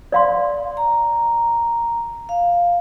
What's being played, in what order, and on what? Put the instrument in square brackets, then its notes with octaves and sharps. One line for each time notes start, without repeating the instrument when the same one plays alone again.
[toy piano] D5 F5 C6
[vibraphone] A#5
F5